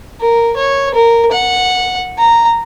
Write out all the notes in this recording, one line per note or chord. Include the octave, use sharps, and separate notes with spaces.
A#4
C#5
A#4
F#5
A#5